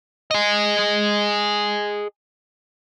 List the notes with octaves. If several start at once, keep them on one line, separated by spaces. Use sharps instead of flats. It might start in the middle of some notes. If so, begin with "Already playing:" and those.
G#4 D#5